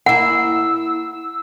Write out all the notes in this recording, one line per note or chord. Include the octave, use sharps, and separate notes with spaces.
A#3 E4 F#5 E6